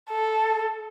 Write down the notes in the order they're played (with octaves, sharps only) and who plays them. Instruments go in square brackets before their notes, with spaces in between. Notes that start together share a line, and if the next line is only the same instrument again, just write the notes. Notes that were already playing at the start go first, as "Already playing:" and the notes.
[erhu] A4